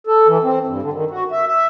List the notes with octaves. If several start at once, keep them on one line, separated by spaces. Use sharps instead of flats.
A4
E3
C4
G2
D3
D#3
F#4
E5
E5